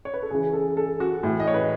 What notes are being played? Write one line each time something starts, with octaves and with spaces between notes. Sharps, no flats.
C#5
B4
A4
C#3 E3 G#4
A4
A4
F#4
A2 E3
D#5
C#5
B4